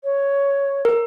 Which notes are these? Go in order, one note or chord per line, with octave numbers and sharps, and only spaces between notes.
C#5
A#4